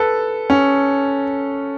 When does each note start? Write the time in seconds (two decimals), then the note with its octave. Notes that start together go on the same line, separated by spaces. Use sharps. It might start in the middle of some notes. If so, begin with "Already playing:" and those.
Already playing: A4 B4
0.50 C#4